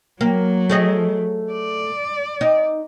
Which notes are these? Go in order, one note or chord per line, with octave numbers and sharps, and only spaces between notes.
F#3 A#3
A3 G#4 D#5
D5
D#4